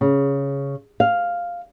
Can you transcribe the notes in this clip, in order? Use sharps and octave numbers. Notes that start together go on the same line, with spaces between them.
C#3
F5